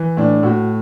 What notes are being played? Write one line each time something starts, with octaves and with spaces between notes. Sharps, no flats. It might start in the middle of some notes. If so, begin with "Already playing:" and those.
Already playing: E3
A2 D4
A2 F#4